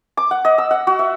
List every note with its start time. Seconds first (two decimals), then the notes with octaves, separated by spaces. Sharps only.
0.17 D6
0.31 F#5
0.45 D#5
0.58 E6
0.71 F#5
0.87 F#4
0.99 E5